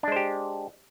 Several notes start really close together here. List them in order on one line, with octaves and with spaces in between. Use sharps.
D4 G#3 C5 G4